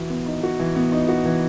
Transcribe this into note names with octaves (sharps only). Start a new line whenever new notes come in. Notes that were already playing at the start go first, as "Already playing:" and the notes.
Already playing: E3 F#4
B3
D#4
F#4
E3
B3
D#4
F#4
E3